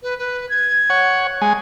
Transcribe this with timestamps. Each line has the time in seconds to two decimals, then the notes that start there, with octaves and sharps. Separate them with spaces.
0.03 B4
0.18 B4
0.49 G#6
0.90 C#5 F#5
1.42 G#3 G#5